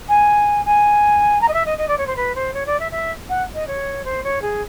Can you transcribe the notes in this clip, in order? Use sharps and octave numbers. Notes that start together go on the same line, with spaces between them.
G#5
G#5
A#5
D#5
E5
D#5
D#5
D5
C#5
C5
B4
C5
C#5
D5
E5
E5
F#5
D#5
C#5
C5
C#5
G#4